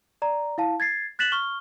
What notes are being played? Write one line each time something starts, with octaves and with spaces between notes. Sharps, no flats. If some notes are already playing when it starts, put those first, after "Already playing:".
D5 A#5
E4 F5 A5
G#6 A6 C7
F#6 A6 B6 E7 F#7
C#6 F6 G7